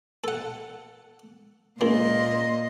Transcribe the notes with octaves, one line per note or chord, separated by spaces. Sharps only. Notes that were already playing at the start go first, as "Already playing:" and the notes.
A4 F#5
C#2 A#2 A#3 D#5 C6